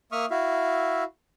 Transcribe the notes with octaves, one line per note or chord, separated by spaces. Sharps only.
A#3 E5 C#6 D#6 F6
E4 F#4 E5 F5